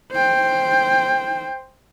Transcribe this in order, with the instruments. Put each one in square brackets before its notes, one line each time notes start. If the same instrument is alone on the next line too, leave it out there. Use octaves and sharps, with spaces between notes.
[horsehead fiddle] C5 G5